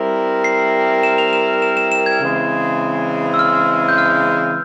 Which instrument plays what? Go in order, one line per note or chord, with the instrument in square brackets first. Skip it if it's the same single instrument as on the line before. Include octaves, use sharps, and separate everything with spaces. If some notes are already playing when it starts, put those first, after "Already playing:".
Already playing: [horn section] G3 C4 E4 A#4
[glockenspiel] C7
E7
F7
E7
E7
E7
E7
G#6
[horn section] C#3 E3 G#3 C4
[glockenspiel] E6
F6
G6
F6